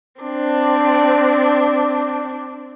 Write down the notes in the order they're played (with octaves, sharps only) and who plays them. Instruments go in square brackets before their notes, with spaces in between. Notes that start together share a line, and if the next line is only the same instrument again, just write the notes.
[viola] C4 D4